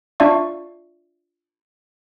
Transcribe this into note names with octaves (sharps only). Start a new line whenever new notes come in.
D4 F4 D5 E5 F5 C#6